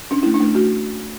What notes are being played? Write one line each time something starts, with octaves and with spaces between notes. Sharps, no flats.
C#4 D4
A3 E4
D4
A3
A3 F#4